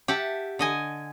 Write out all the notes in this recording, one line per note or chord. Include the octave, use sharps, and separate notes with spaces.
G4 E5 F#5 A5
D3 D#5 G#5